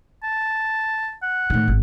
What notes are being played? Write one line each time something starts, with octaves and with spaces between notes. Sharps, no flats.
A5
F#5
A2 D#3
G#1